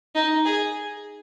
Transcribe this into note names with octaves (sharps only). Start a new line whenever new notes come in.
D#4
G#4